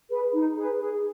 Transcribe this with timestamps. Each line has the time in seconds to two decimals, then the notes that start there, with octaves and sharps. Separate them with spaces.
0.09 G#4 B4
0.32 D#4
0.56 G#4 B4
0.79 G#4